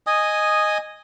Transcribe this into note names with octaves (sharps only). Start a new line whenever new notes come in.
D#5 G#5 D#6